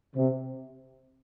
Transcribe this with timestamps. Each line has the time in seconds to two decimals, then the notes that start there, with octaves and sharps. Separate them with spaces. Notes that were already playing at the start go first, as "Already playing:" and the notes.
0.16 C3